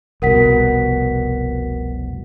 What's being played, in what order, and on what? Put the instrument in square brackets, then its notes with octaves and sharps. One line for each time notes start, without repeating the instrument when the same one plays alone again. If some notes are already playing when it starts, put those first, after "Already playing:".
[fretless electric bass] F1 C2 B2 [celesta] A#4 F#5 B6